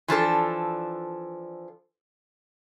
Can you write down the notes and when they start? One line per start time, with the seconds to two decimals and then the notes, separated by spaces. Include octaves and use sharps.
0.08 E3 F3 D4 A4